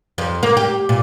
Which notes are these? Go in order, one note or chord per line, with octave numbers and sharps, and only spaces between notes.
F2
A#3
G4
A#2